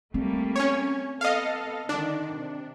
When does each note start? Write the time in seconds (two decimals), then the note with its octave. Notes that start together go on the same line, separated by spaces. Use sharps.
0.14 G3 A3 A#3 C4
0.56 C#4 C#5
1.21 B3 A4 D#5 F5
1.89 D3 D#3 D4
2.35 C3